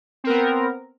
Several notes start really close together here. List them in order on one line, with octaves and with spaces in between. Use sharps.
C4 A#4 B3